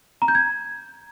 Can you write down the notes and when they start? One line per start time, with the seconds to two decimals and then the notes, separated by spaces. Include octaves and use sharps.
0.22 A#5
0.28 G6
0.35 G#6